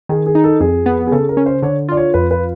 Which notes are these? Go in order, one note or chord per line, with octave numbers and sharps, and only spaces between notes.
D#3 G#4
G#4
D#4
A4
F2 G#4
B3
G#4
C#3 A4
A#4
C#4
C5
D3 C#5
F4 D5
C#5
F2 B4
B4